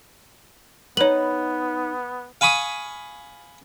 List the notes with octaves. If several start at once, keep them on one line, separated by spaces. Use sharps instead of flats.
B3 D#4 B4 C#5 F#7
F5 G#5 B5 C#6 D#6